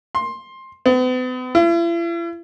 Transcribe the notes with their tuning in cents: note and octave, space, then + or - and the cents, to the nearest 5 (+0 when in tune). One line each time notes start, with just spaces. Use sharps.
C6 +15
B3 +45
E4 +45